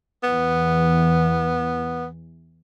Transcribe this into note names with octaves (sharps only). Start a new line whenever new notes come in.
E2 E3 B3